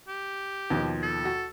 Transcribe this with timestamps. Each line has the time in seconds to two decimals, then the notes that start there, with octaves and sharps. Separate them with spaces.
0.08 G4
0.70 D#2 B2 F3
1.02 A4
1.25 F#4